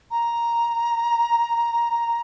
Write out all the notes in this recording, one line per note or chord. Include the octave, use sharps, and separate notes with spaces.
A#5